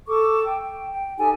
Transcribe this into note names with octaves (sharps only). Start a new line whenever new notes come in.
A4 C#6 D6
G5
G5
D#4 G4 A4 G#5